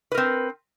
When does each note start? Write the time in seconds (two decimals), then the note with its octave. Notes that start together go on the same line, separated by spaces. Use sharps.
0.12 B4
0.15 A#4
0.18 C4